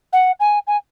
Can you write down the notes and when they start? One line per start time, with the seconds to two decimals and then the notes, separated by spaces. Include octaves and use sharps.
0.12 F#5
0.40 G#5
0.67 G#5